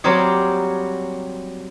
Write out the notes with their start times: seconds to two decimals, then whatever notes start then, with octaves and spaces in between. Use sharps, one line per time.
0.04 F#3 G3 A#3 C4 G4 G#4